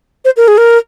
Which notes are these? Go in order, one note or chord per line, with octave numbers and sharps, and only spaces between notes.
C5
A#4
G#4
A#4